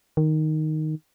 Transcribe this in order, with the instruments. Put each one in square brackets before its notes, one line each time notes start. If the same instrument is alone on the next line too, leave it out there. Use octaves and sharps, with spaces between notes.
[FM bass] D#3